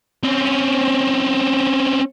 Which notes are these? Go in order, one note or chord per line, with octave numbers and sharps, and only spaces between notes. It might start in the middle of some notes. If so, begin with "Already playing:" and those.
C4 C#4